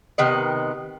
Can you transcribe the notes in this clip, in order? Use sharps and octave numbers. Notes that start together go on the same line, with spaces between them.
C3 D#3 B3 D#5